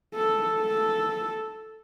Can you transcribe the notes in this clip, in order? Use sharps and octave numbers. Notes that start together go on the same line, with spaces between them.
A4
A4